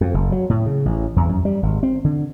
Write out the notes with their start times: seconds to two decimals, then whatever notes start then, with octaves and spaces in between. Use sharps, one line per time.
0.01 F2
0.14 F#1
0.32 F#3
0.50 A2
0.66 C#3
0.85 A1
1.16 E2
1.29 F#2
1.45 G3
1.63 G#1
1.83 C4
2.04 D3